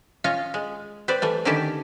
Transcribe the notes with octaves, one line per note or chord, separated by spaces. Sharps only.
C#4 F4 C#5 D#5 F5
G#3
C4 B4 C5 D5
E3 G3 A3
D3 D#3 C#4 E4 G4 A5